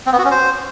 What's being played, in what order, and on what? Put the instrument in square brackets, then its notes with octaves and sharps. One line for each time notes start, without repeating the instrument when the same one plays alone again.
[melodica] C4
B3
F#4
C#4
C5